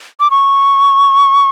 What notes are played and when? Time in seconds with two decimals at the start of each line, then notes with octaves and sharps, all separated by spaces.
0.20 D6
0.31 C#6